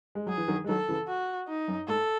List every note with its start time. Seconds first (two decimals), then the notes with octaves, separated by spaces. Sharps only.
0.15 G#3
0.27 F#3 G#4
0.37 E3
0.48 D#3 F#3
0.64 G#3
0.68 D#3 F#3 A4
0.89 C#3 E3
1.08 F#4
1.48 D#4
1.68 F#2
1.88 G#2 A4